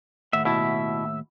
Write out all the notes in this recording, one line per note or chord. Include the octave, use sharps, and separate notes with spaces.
D#2 A2 E5 F#5
B2 E4 E5 A5